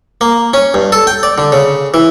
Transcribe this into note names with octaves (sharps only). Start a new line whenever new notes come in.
A#3
C#4
G2
A4
G5
D5
D3
C#3
E3